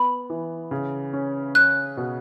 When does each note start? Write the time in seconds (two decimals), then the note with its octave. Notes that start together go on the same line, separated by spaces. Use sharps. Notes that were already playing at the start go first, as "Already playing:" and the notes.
Already playing: B3 B5
0.30 E3
0.71 C#3
1.13 C#4
1.55 C#4 F#6
1.97 B2